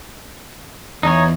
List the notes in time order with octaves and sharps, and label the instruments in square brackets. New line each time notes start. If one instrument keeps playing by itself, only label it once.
[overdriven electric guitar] E2 [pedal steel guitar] D#4 C#5